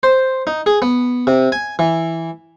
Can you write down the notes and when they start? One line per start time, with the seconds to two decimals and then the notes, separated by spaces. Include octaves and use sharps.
0.03 C5
0.47 D#4
0.66 G#4
0.82 B3
1.27 C3
1.52 G#5
1.79 E3